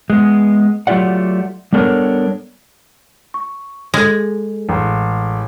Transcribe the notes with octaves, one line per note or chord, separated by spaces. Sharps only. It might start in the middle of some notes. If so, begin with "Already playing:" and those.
G#3 B3
F#3 A3 F4 G4 D5 F#5
G3 B3 D4 A4 A#4 C#5
C#6
G#3 G#4 A4
A1